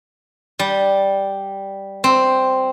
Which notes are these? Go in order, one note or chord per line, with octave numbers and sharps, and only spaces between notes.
G3
C4